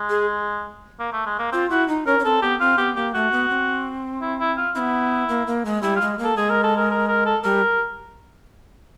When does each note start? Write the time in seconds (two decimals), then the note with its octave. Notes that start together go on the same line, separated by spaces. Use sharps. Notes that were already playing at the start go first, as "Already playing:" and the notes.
Already playing: G#3
0.10 G#4
1.00 A#3
1.13 A3
1.26 G#3
1.39 A#3
1.52 C4 F4
1.70 E4 F#4
1.88 D#4
2.07 C#4 A#4
2.19 C#4
2.25 C4 A4
2.42 B3 G4
2.60 C4 F4
2.78 B3 G4
2.96 A#3 G4
3.14 A3 F#4
3.32 B3
3.50 C4
4.21 E4
4.40 E4
4.57 F4
4.75 B3 C4 E4
5.29 A#3
5.47 A#3
5.65 G#3
5.83 G3 E4
5.96 F4
6.01 G#3
6.19 A#3
6.24 A4
6.36 G#3 G#4
6.50 A#4
6.64 A4
6.77 A#4
6.91 A#4
7.08 A#4
7.26 A4
7.44 G3 A#4